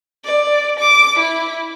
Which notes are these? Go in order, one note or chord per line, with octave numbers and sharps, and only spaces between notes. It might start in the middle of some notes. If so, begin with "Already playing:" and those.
D5
D6
E4